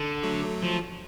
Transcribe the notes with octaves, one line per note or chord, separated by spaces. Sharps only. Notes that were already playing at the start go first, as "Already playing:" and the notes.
Already playing: D3
F#3 A3
F3